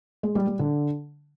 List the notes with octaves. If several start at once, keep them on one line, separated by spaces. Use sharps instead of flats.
G#3
G3
G3
D3